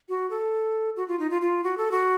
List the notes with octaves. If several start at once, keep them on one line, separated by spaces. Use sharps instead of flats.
F#4
A4
F#4
F4
D#4
F4
F4
F#4
A4
F#4